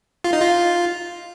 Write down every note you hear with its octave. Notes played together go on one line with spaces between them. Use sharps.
F4
D#4
F4